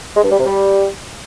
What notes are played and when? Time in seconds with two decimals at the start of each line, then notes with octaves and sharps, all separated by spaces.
0.16 G#3
0.23 G2
0.31 G3
0.38 C3
0.46 G3